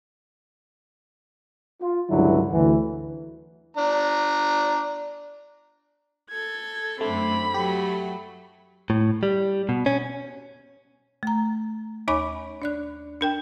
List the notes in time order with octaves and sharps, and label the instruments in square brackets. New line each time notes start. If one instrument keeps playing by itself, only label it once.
[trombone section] F4
C#2 G2 D3 F#3 E4
D2 E3
[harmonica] D4 A#5
[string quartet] A4 G#6
[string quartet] F#2 D3 C4 [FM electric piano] A3 [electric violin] B5
[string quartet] F#3 A3 F#4 [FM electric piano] G4
[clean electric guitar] A2
G3
B2
C#4
[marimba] A3 A#5
D#2 D#4 C#5 G#5 B5 D6
D4 D5 F#6
D4 A#4 G5